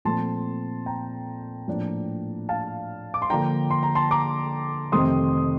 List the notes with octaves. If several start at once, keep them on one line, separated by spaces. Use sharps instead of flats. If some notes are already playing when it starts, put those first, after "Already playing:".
A#2 F3 A3 C4 A5 C6
G5 A#5
A2 F3 A#3 D4
F5 A5
D6
C6
D3 F3 A#3 D4 G5 A#5
C6
A#5
A5 C6
A#5 D6
F2 C3 D#3 A3 C4 C6 D#6